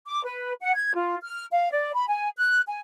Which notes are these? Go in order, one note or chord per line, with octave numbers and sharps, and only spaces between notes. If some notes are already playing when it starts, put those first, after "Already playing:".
D6
B4
F#5
G#6
F4
F6
F5
D5
B5
G#5
F#6
G#5